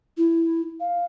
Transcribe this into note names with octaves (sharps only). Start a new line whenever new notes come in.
E4
F5